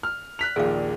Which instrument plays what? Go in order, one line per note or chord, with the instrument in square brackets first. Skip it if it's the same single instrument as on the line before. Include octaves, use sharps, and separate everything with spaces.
[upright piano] F6
F#6 B6 F7
[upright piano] A#1 D#2 A#2 [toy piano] G#4 F5